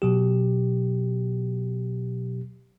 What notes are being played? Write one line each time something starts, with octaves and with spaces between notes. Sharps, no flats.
B2 F#3 G4